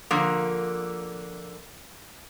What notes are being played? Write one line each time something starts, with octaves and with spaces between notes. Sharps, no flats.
D3 F3 A#3